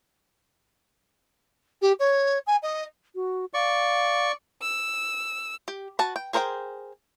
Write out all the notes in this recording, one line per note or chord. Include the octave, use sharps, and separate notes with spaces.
G4
C#5
G#5
D#5
F#4
D5 F5 C#6
E6
G4
F#4 B4 A5
G5
G#4 A#4 C5 F#5 G5